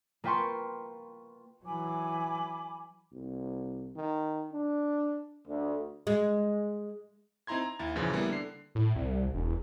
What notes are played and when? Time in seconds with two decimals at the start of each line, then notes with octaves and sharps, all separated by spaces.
0.24 A#3 F4 B4 G5 C6 C#6
1.65 E3 F#3 G#5 B5 D6
3.13 C2
3.96 D#3
4.53 D4
5.47 D2
6.07 G#3
7.47 C4 D#4 E4 A#5 C6 G#6
7.62 A#5
7.79 D#2 E4 A6
7.95 A#1 F#2 C#3 E3 F3
8.13 G3 A#3 B3 E4
8.29 D3 C7
8.75 A2
8.96 C2
9.34 E1